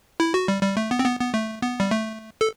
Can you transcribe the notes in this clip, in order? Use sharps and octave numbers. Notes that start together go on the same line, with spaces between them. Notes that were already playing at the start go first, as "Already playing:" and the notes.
E4
F#4
G3
G3
A3
B3
C4
B3
B3
A3
B3
G3
A3
A4